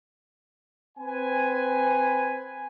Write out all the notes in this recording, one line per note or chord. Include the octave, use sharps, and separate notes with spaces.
C4 B4 C5 G#5